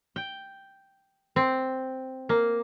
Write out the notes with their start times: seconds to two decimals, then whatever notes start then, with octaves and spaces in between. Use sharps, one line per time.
0.16 G5
1.36 C4
2.29 A#3